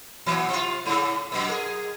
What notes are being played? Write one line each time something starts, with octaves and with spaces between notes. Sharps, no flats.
A#2 E3 F#3
C3 F4
G#2 C#3
F#2 B2
G#4 A#4